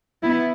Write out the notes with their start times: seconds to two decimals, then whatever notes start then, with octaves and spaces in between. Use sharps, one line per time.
0.23 B3 E4